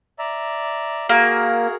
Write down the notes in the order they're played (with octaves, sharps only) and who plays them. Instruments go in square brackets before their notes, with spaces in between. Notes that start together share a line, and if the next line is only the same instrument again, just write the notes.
[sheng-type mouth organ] D5 E5 A#5
[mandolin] A#3 [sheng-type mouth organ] F#4 G#4 A#4